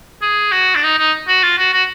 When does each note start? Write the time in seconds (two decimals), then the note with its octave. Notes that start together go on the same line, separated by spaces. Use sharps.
0.22 G#4
0.52 F#4
0.75 D4
0.83 D#4
0.98 D#4
1.28 F#4
1.43 F4
1.58 F#4
1.73 F#4